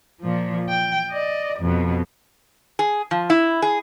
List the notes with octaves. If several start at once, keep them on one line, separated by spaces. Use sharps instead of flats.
A#2 F3
G5
D5 D#5
F2 B2
G#4
F3
E4
G#4